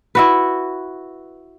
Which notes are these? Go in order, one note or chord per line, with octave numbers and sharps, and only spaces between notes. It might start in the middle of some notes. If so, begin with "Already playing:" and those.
E4 F#4 B4